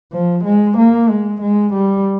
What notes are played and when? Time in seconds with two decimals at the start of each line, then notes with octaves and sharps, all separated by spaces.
0.12 F3
0.44 G#3
0.77 A#3
1.09 G#3
1.41 G#3
1.73 G3